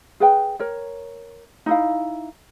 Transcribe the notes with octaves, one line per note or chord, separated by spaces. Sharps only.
G#4 B4 G5
A#4 C#5
D#4 E4 F5